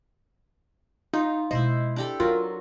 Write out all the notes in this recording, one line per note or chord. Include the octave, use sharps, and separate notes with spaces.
D#4 F4
B2 G#3 E4 C5 D#5
D4 G4 A4
F#3 C#4 F4 A#4